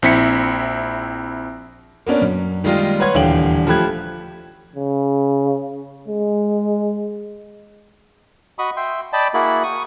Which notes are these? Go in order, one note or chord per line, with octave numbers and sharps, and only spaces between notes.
A#1 C4 E4 B6 C#7
A#3 B3 C#4 D4
F#2
D#3 G3 G#3 A#3 D#4 F4
B4 C#5 F#5 C6 G#6
D#1 E2 D3 F5 G5 F#7
F3 A3 G4 B5 F#6 G#6
C#3
G#3
F#4 D#5 B5 C#6 D#6
E5 G5 C6
D5 D#5 G5 A5 B5 D6
A#3 E4 F#4 G#4 B5
C#6 D#6